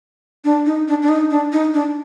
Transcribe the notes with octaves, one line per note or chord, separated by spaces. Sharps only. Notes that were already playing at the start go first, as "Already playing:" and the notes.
D4
D#4
D4
D4
D#4
D4
D#4
D4